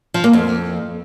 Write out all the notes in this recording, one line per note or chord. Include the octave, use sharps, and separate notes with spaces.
F3
A#3
F2